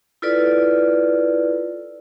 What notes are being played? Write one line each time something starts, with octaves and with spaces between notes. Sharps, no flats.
E4 F4 A4 B4 D5